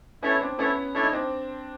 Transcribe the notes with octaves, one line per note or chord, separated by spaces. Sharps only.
B3 C#4 E4 A4 C#5 E5
C4 D4
B3 C#4 E4 A4 C#5 E5
D4 E4 A4 C#5 E5
D#4
C4 D4